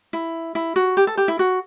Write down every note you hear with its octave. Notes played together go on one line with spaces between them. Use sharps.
E4
E4
F#4
G4
A4
G4
E4
F#4